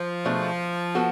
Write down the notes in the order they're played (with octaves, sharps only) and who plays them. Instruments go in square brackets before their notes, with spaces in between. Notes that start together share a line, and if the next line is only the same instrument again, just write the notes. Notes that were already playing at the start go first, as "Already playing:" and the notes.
Already playing: [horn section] F3
[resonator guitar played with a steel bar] B2 A3 D4 G#4
B3 F#4 A4